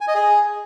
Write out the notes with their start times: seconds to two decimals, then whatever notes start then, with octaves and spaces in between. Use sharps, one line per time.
0.01 G#5
0.08 D#5
0.15 G#4